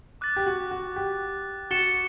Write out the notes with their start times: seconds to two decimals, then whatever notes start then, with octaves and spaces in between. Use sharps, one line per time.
0.21 D6 F#6 A6
0.36 G4
0.46 F#4
0.71 F#4
0.96 G4
1.71 F#4 A6 C#7 E7 G7